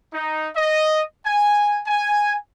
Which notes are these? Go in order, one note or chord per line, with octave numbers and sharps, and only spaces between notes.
D#4
D#5
G#5
G#5